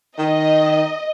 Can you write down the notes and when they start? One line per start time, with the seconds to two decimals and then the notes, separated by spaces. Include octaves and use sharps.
0.18 D#3 D#5